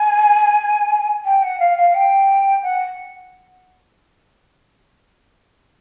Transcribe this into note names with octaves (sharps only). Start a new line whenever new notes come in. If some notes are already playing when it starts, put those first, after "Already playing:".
Already playing: G#5
G5
F#5
F5
F5
G5
F#5